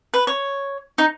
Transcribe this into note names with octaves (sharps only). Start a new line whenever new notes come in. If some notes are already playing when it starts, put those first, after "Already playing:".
B4
C#5
D#4